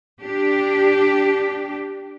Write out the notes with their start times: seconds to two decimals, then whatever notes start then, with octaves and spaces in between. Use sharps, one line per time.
0.20 D4 G4